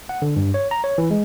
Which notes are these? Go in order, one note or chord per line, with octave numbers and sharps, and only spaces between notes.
F#5
D3
G2
C#5
A#5
C#5
E3
G#3